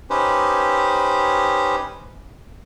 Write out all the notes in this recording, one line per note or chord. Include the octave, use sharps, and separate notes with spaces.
C#4 D#4 G4 B4 C5